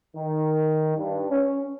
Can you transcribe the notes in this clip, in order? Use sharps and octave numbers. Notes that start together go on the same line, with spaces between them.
D#3
G2
C#4